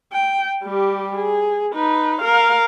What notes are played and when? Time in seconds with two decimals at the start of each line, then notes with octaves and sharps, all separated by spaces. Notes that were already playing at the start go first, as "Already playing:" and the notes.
0.13 G5
0.64 G3 G4
1.18 G#4
1.74 D#4 B4
2.22 A#4 F5